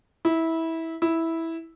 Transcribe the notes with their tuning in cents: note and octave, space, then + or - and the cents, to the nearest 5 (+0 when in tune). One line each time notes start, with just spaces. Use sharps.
E4 -20
E4 -10